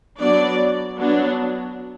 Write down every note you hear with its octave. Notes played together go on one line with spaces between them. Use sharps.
F#3 B3 D4 D5
F#3 B3 D4